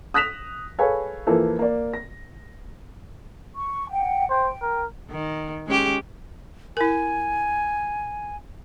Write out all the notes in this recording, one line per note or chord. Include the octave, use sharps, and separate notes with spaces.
D#6 F#6 A#6 B6 E7 F7
G#4 A4 B4 C#5 F5 G#5
E3 F3 A#3 A4
A#3 D5
A#6
C#6
F#5 G5
C5 G5
A#4
D#3
G#3 C#4 G4
E4 A#4 G#5